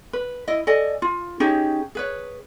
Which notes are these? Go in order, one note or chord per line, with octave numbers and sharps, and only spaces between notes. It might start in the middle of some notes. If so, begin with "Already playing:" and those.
B4
E4 D#5
A4 D5 D#5 G#5
F4
C#4 D#4 G4 G#4
G#4 B4 C#5